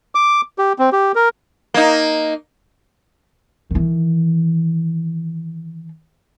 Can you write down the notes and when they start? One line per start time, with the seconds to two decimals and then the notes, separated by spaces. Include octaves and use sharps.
0.15 D6
0.58 G4
0.79 C4
0.93 G4
1.15 A#4
1.74 A#3 D#4
3.71 D#3 E3